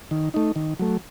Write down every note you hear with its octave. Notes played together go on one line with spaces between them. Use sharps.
D#3
A3 D#4
D#3
F#3 A3